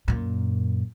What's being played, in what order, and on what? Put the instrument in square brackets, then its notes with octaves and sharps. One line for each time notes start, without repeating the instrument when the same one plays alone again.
[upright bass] F#2 A#2